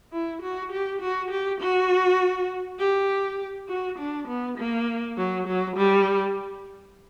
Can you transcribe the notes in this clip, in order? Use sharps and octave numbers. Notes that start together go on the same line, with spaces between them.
E4
F#4
G4
F#4
G4
F#4
G4
F#4
D4
B3
A#3
F#3
F#3
G3